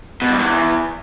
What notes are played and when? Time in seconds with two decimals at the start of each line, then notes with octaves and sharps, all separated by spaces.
0.22 B2
0.30 G2
0.39 E2